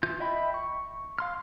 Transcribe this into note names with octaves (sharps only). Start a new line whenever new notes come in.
E3 F4 G6
D#5 E5 G5 B5
C#6
F5 C6 F6